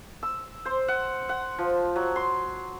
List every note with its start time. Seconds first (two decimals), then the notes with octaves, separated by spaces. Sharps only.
0.23 E6
0.65 C5
0.88 F#5
1.29 F#5
1.59 F3
1.96 F#3
2.16 C6